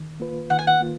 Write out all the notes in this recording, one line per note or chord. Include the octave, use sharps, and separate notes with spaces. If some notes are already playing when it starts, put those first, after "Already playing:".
Already playing: D#3
A#3 F4 B4
D#3 F#5
G#5
F#5
A#3 F4